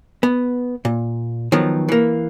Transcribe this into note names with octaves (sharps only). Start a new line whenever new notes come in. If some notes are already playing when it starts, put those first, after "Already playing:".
B3
A#2
D#3 F3 F#3 B3
E3 A#3